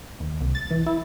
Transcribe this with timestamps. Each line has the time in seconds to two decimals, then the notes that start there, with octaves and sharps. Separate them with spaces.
0.20 D#2
0.40 C2
0.55 A6
0.70 E3
0.86 E4